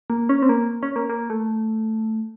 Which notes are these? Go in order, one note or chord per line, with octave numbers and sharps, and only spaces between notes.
A#3
C#4
C4
A#3
C#4
A#3
A#3
A3